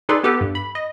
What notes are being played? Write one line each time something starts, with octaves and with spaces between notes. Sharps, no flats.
D#4 G#4 A4 B4 D5 C6
B3 G4 A4 B4
G2
B5
D#5